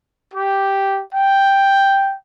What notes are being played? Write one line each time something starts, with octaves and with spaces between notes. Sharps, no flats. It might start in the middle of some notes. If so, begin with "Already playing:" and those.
G4
G5